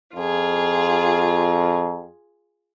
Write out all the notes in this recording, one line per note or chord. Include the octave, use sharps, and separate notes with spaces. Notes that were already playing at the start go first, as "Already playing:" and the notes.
F2 F4 G#4